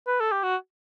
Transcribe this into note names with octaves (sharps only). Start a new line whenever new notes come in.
B4
A4
G4
F#4